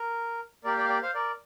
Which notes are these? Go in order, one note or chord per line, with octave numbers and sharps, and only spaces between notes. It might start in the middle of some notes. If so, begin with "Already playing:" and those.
Already playing: A#4
A#3 G4 A#4 D5
D5 G5
F5
D5 G5
C5 F5
A#4 D5